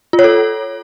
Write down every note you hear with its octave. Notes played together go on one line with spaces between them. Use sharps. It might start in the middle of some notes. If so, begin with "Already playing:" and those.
F4
C#5
A4